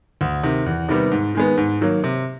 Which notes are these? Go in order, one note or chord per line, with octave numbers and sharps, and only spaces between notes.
D2
C3 D#3
E2
C3 D#3 G3 B3
G#2
D#3 G#3 B3
G#2
D#3 F#3 A#3
C3